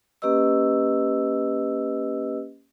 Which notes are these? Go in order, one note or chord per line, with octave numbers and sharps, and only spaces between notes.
A#3 C#4 G4 B4 D#5 E6